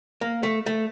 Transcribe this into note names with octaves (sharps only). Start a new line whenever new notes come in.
A#3
A3
A3